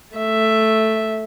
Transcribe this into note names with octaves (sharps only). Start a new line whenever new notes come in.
A3 E5